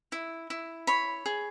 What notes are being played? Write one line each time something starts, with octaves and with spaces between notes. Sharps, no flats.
E4
E4
C#5 B5
G#4